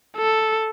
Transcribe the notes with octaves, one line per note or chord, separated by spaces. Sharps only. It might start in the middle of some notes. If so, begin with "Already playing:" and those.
A4